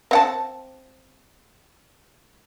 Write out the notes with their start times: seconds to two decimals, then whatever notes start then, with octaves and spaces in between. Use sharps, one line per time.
0.11 C4 F#5 A5